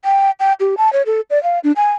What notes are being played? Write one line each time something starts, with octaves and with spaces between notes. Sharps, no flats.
G5
G5
G4
A5
C#5
A4
D5
F5
D4
G#5